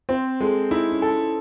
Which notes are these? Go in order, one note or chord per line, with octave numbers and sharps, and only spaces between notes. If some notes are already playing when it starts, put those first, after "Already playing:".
C4 C5
G#3 A4
D#4 E4
C#4
A4